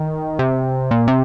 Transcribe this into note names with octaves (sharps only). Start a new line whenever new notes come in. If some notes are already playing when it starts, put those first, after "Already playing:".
Already playing: D#3
C3
A#2
C3